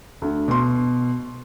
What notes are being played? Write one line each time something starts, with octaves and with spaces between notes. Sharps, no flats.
D2
B2 C6